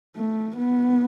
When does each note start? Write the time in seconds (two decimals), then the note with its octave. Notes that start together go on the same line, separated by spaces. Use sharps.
0.16 A3
0.57 B3